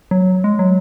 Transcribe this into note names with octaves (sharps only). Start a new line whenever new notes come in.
F#3
G#3
F#3